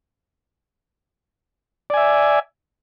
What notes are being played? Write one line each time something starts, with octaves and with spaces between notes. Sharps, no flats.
D5 E5 G#5